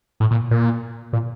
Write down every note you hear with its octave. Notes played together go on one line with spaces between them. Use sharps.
A2
A#2
A#2
A#2